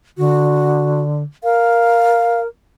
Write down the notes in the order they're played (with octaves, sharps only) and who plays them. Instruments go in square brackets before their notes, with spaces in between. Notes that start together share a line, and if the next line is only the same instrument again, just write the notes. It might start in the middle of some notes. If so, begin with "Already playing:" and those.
[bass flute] D3 [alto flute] F#4
[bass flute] A#4 [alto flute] F5